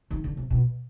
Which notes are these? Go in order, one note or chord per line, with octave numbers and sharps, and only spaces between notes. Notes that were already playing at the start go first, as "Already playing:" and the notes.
D#3
D3
C3
B2